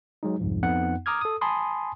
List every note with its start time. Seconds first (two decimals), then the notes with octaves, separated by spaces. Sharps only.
0.23 F#3 G#3 D#4
0.40 C2 F2 G#2 F3
0.63 F2 B3 D#4 F#5
1.06 A#5 D6 D#6 F6 G#6
1.21 A4 D#6
1.41 G#5 A5 B5 C6 D#6